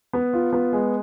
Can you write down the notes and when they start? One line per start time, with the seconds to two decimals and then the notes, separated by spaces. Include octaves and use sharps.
0.13 B3
0.33 F4
0.53 B3
0.73 G#3